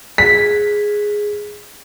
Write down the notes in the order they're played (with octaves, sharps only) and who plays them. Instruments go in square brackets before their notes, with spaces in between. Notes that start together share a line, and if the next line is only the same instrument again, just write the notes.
[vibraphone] G#4 [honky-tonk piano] B6